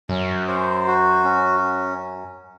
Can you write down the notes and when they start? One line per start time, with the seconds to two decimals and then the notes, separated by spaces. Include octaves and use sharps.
0.09 F#2 C#4
0.48 C5
0.87 F#4
1.25 C#4